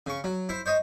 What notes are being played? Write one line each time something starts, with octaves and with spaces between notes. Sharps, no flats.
C#3 C#6
F#3
E4 C5
C5 C#5 D#5